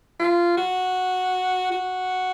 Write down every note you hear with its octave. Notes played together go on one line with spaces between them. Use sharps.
F4
F#4
F#4